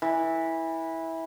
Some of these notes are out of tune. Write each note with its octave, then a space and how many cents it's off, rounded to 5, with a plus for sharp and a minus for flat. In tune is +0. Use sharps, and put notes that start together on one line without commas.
E3 -15